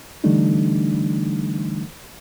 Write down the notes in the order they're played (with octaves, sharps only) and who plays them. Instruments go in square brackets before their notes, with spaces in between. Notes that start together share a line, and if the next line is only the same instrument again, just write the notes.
[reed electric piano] D3 E3 G3 A3 D4 D#4